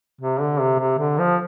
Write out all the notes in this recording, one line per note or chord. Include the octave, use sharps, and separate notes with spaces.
C3
D3
C3
C3
D3
F3